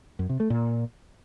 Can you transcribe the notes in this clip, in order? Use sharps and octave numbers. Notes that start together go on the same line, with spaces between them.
F#2
C3
A3
A#2